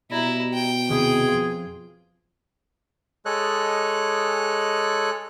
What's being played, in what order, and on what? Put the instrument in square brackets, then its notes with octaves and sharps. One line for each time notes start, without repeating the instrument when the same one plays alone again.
[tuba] B2 [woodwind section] G3 D#5 A#5 [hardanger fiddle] E4
[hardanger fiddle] G5
[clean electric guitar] D#2 C3 E4 [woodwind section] G#4
[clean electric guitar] F2 F4
[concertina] G#3 A4 C#5 D#5 F#6